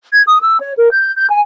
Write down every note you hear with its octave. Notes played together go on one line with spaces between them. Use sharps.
G#6
D#6
E6
C#5
A#4
G6
G6
G#5